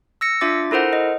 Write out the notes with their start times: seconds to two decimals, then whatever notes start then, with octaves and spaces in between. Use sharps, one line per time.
0.21 E6 A#6 C#7
0.41 D4 F4 E5 D6 A6
0.71 E4 A4 A#4 C5 F#5
0.93 D#5